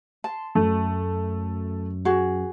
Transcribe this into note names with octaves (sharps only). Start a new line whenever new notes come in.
A5 C6
F#2 A3
F#4 G#4